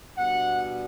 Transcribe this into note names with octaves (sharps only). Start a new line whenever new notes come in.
B2 G3 D4 F#5